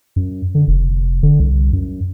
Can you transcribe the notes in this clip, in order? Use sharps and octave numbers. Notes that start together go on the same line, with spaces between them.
F#2
D3
F1
D3
C2
F#2